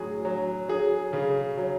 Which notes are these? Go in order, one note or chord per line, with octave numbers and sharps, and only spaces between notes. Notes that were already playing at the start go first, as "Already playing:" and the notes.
Already playing: A2 F#3 G#4
F#3
F#3 G#4
C#3
F#3